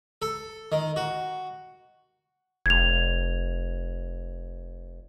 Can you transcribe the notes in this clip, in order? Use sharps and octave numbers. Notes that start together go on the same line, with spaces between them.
A4
D#3
F#4
F1 G#6 F7